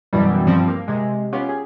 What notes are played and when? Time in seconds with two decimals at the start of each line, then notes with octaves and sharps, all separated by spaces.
0.13 F#2 B2 E3 F#3 G3
0.47 G2 F3 G3 C4
0.68 A#3
0.88 C3 G#3
1.32 B3 C#4 F4 G4
1.49 G#4